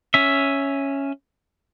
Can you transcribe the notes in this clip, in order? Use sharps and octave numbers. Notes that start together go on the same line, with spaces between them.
C#4 E5